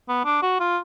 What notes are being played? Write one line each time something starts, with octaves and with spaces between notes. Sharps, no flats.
B3
D4
F#4
F4